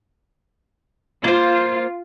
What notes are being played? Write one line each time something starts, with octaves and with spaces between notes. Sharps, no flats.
A#3 F4 C5